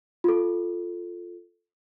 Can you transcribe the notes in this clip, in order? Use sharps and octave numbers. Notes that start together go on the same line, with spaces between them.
F4 A4